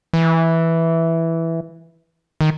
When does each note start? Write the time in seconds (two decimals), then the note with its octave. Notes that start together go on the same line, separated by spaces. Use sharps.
0.13 E3
2.41 D#3